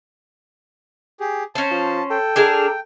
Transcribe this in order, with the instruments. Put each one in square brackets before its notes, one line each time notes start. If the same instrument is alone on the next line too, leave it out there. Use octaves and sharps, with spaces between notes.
[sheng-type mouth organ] G4 G#4
[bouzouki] C#4 C5 [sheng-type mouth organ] A5
[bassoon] F3
[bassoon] A4 [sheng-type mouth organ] G5
[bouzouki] D4 G#4 A#4